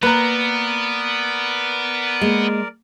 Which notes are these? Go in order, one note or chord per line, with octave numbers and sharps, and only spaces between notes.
A#3 B3 A#4 B4 D5 A#5
G#3 A#3